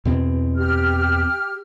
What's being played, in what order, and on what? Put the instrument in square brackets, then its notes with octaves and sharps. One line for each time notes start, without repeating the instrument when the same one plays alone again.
[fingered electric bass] E2 B2 C4
[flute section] G4 F6